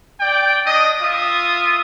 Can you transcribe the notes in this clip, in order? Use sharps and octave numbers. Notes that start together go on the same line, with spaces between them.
D5 G5
D4 D#5
F4 E5 D#6